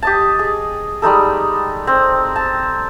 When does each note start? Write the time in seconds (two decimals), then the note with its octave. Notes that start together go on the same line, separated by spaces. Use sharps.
0.02 G4 D#5 A5
0.39 G#4
1.02 G3 G#3 D#4 A4
1.87 C4
2.36 A5